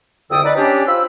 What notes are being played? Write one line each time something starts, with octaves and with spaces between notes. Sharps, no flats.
C2 F2 D3 G5 D#6 E6
D#4 B4 D5
C#4 D4 G4
F4 C5 B5 E6